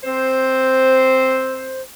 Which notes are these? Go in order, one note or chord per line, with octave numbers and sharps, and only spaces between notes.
C4 C5